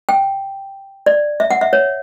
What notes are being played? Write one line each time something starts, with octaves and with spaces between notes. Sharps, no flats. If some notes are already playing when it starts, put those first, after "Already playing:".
G5
D5
E5
F#5
E5
C#5